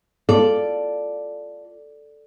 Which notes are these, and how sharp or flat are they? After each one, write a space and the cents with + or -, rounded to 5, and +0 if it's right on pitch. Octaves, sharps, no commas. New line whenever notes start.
F4 +0 A4 +0 D5 +0